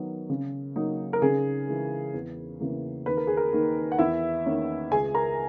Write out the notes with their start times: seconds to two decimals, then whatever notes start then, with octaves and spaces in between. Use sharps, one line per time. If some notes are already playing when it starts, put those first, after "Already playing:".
Already playing: D#3 F#3 B3 A#4
0.30 C#3
0.76 F#3 A#3 D#4
1.13 A#4
1.22 C#3 G#4
1.67 E3 G#3
2.14 E2
2.60 C#3 E3 A#3
3.06 D#2 B4
3.17 A#4
3.27 G#4
3.37 A#4
3.53 D#3 A#3
3.92 F#5
3.99 E2 E4 E5
4.46 D#3 A#3 C#4
4.91 C#2 G#4 G#5
5.14 A#4 A#5